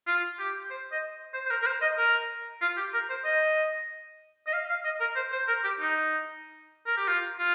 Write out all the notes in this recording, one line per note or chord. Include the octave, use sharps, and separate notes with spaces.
F4
G4
C5
D#5
C5
C5
A#4
A#4
C5
D#5
A#4
F4
G4
A#4
C5
D#5
D#5
F5
F5
D#5
A#4
C5
C5
A#4
G4
D#4
A#4
G4
F4
F4